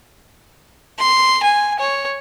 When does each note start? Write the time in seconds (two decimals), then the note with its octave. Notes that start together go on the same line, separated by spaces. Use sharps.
0.98 C6
1.43 G#5
1.79 C#5